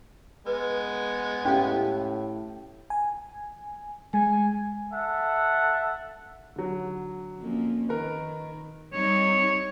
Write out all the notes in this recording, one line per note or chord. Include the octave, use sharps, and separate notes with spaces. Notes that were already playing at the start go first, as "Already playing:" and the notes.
G#3 B3 B4
A2 C#4 G4 F5 G5
G#5
G#3 G#5
A4 E5 F#5
D3 F#3
F2 A#3 C#4
D#3 A#4 B4
G3 C4 D#4 C#5